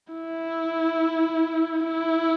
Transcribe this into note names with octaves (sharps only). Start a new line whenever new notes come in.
E4
E4